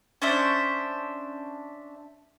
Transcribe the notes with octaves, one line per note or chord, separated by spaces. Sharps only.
C#4 D4 C5 E5